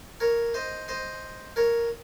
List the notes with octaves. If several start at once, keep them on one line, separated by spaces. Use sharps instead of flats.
A#4 C#5
C5 D#5
C5 D#5
A#4 C#5